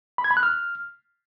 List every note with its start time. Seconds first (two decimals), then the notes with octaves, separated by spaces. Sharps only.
0.18 B5
0.24 G#6
0.31 B5
0.37 F#6
0.43 F6